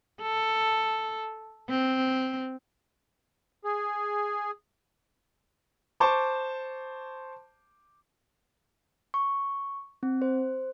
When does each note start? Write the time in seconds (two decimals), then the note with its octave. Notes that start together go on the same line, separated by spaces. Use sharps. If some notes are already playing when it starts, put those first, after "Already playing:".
0.22 A4
1.69 C4
3.64 G#4
6.00 C5 A5 C#6 D6
9.14 C#6
10.03 C4
10.22 C5